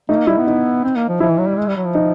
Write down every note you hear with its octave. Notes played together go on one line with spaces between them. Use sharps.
A3 D#4
A#3
G3 E4
B3
D#4
C4
A#3
F3
F3 E4
E3
F#3
G3
G#3
G3
F#3
F3
D#4